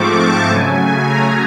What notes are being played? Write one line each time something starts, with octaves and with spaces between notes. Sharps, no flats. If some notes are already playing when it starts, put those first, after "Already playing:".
Already playing: G#2 F3 A3 C4 C#6 D6
A5
C#3 F#3 A3 G#5
A#5